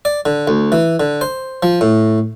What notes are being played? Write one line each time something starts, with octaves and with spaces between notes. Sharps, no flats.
D5
D3
D2
E3
D3
C5
F3
A2